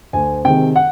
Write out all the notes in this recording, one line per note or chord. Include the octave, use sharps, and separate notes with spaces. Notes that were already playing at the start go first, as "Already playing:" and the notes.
D2 G#5
C3 D#3 G#3 G5
F#5